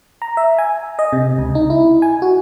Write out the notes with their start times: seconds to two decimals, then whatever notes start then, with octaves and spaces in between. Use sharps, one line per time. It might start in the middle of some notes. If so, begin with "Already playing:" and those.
0.22 A#5
0.37 E5
0.58 G#5
0.99 D#5
1.13 C3
1.39 C#2
1.55 D#4
1.70 E4
2.02 G#5
2.22 F#4